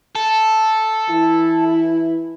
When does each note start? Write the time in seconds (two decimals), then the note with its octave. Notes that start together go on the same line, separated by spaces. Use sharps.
0.15 A4
1.09 E3 E4